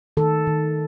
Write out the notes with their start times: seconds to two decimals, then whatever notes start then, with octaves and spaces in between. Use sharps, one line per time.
0.17 D#3 A4
0.47 D#3